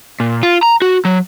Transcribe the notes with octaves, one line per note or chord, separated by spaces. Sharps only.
A#2
F4
A#5
F#4
F#3